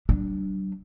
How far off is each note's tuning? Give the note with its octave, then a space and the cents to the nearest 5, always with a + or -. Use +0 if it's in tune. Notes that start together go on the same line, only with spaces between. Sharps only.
G3 -45 D4 +0